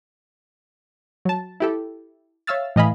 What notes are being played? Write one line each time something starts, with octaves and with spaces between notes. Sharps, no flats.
F#3 A5
E4 G4 A4
C#5 E5 F5 E6 F6 A6
A2 E3 D#5 F5 G#5 B5